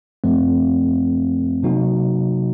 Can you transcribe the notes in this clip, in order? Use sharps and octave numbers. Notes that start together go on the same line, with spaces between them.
F#2 F3 A3 C4
C3 F#3 A#3 D#4 F#4